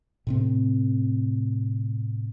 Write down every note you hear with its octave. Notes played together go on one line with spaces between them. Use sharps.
A2 C3 C4